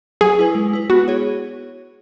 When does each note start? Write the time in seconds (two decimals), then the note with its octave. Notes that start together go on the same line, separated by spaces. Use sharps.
0.21 F#3 G#4
0.39 E4 B4
0.55 G#3
0.73 E4 B4
0.90 B3 F#4
1.08 G#4 C#5